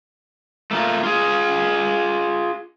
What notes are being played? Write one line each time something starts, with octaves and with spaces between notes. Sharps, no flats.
A3 A#3 F4
F4 G#4